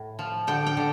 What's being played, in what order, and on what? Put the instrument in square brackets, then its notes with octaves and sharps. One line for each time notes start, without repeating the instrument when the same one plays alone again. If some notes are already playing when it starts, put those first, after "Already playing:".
Already playing: [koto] A2
F3
D3 G5
G5
D3